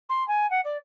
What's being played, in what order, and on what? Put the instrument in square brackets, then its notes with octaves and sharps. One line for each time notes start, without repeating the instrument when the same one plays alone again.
[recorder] C6
G#5
F#5
D5